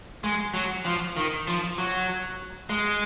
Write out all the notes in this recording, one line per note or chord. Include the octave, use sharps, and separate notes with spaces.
G#3
F#3
F3
D#3
F3
F#3
G#3